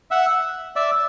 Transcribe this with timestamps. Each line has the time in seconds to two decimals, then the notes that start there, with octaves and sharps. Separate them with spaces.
0.11 E5 F#5
0.76 D5 E5